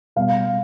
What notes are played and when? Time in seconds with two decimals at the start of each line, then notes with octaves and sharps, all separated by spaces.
0.16 B2 G3 B3 F5